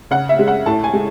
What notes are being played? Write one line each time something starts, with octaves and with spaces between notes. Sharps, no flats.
C#3 F#5
E5
G#3
F#5
A2 A5
G#5
G#3